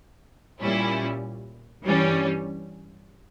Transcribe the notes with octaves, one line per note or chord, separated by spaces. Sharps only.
A#2 G3 C#4 E4
G2 E3 G3 C#4